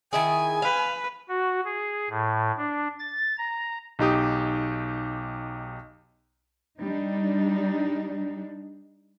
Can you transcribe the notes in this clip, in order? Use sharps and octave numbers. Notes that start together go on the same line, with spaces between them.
D#3 E4 G#4 G#5
B4 F5
F#4
G#4
A2
D4
A6
A#5
B1 D#4 G4 D#6
G3 D4 D#4